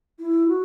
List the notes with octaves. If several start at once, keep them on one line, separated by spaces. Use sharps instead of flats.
E4
F#4